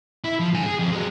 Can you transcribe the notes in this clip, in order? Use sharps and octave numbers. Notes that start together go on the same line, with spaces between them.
E4
F3
G2 G#5
G#4
F2
F#3 G#3